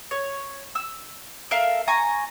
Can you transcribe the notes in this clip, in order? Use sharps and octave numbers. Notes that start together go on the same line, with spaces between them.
C#5
E6
A4 A#4 E5 F5
G#5 A#5 C#6